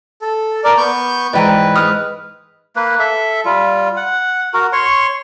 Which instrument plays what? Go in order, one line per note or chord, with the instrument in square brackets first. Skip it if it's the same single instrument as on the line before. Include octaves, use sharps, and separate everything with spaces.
[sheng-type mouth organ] A4
A#4 D5
B3 C#6 G6
[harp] G#2 E3 [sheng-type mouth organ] B4 [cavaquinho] D5 G5 A#5
[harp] G#2 F6 [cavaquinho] D#6
[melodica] A#3 B4
A4 E5
G3 F4
F#5
F#4 A#4
C#5 C6 C#6